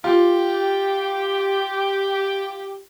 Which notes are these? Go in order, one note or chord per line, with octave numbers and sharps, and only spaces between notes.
F4 G4